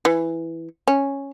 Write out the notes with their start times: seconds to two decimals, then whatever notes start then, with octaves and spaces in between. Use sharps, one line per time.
0.05 E3
0.88 C#4